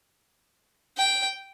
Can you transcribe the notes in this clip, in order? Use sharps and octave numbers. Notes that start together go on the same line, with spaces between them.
G5